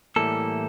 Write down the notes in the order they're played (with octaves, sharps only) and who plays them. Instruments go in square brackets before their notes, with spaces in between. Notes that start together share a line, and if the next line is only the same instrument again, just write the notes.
[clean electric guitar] A2 E3 G3 A#3 A4